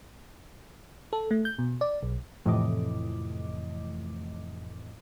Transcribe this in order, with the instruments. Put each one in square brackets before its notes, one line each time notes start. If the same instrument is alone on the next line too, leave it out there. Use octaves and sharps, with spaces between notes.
[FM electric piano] A4
A3
G6
B2
D5
B1
[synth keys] F2 A2 C3 E3 D#5 D6